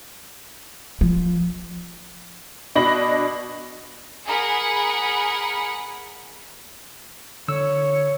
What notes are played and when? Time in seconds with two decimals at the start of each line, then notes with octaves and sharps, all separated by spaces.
1.01 F3
2.75 B2 D4 D#5 B5 A#6 F#7
4.26 G#4 A#4 F#5 B5
7.48 D3 C#5 E6